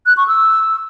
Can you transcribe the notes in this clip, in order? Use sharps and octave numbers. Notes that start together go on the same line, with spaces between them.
F#6
C#6
E6